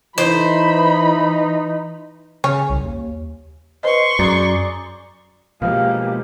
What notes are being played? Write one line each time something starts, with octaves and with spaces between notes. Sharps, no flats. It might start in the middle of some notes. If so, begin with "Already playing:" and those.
E3 D#4 C5 B5
C#3 C#4
C2
D#2
B4 C5 D#5 C6 C#6
F#2 G#4 D5 A#5
B2 F3 G#3 A#3 G4 F5